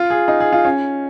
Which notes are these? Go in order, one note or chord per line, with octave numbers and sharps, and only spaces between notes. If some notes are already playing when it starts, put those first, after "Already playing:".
Already playing: F4
G#4
D#4
G#4
F4
C#4